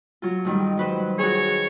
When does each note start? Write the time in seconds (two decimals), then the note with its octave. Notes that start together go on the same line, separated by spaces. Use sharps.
0.22 F#3 F4
0.45 G#2 D#3 G3
0.77 F#3 B4 C5
1.19 F#4 G#4 C#5